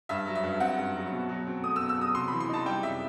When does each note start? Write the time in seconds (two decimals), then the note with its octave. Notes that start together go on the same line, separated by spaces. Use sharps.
0.09 G2 E5
0.27 F#3
0.35 E5
0.44 G2
0.60 C4 F#5
0.78 G2
0.95 F#3
1.12 B2
1.29 F#3
1.47 C4
1.63 A3 D#6
1.76 E6
1.81 B2
1.89 E6
1.98 F#3 D#6
2.14 C3 C6
2.28 E3 B5
2.40 C6
2.49 D#4 A5
2.66 G3 G5
2.83 C3 E5